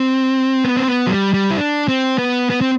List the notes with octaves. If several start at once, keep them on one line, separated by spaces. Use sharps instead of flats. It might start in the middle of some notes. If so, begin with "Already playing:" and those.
Already playing: C4
B3
C4
B3
F#3
G3
G3
E4
D4
C4
B3
B3
C4